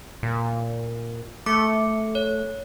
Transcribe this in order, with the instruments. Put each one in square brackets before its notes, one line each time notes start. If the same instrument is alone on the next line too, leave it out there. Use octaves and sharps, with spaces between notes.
[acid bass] A#2
[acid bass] A3 [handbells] D6 C#7
[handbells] C#5